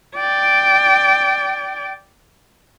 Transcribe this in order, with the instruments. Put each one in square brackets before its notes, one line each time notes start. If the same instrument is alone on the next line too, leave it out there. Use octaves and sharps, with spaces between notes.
[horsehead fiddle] D5 G5